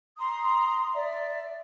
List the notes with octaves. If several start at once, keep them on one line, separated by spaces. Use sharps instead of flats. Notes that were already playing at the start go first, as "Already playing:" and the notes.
A#5 C6 D#6
D5 E5